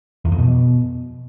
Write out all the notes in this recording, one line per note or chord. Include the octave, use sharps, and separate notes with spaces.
E2
F2
B2